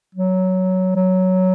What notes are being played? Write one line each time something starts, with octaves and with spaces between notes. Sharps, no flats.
F#3
F#3